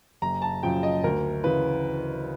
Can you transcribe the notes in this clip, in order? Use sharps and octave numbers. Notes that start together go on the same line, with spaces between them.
F#1 A#5
A5
F#2 C#3 F3 G5
D#5
D2 A#4
C#3 E3 B4